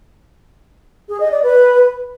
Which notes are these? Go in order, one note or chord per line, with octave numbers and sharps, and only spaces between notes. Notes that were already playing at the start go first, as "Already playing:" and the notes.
G#4
D#5
D5
B4